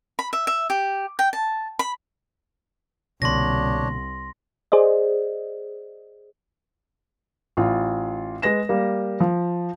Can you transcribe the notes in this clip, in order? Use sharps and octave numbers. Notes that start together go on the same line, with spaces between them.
B5
E5
E5
G4
G5
A5
B5
C2 B2 D3 A#3 D4 C#5 C6 A#6
G#4 C5 D5 D#5
A1 F4
G#3 B4 A#6 E7
G3 A#3
F3